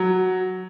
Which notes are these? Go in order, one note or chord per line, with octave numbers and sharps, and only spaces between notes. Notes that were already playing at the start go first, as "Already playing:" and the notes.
Already playing: F#3